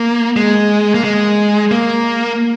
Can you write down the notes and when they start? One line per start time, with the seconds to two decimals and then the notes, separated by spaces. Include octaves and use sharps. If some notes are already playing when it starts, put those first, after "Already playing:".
Already playing: A#3
0.36 G#3
0.94 A#3
1.04 G#3
1.71 A#3